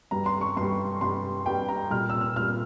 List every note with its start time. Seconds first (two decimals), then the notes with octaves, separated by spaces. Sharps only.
0.11 G2 G3 A#5
0.26 C6
0.41 C#6
0.57 G2 G3 C6
1.01 G2 G3 C6
1.46 G2 G3 G5
1.69 A#5
1.91 A#2 G3 F6
2.10 E6
2.21 F6
2.36 A#2 G3 F6